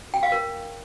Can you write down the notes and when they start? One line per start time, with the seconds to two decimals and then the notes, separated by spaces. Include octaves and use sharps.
0.14 G5
0.23 F5
0.32 A#4